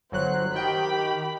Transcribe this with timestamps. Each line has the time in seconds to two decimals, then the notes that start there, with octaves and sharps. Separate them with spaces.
0.12 G1 F#3 C5 F#6
0.54 D#3 G4 G5 B5